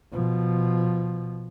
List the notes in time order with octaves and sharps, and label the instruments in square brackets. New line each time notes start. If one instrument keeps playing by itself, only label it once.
[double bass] B2 F3